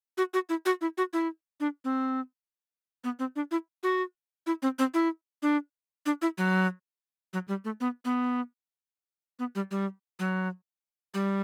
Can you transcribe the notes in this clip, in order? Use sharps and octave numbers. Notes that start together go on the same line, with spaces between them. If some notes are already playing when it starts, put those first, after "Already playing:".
F#4
F#4
E4
F#4
E4
F#4
E4
D4
C4
B3
C4
D4
E4
F#4
E4
C4
C4
E4
D4
D4
E4
F#3
F#3
G3
A3
B3
B3
B3
G3
G3
F#3
G3